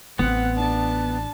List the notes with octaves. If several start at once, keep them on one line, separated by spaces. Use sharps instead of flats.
A1 B3 C4 F#5
D4 A5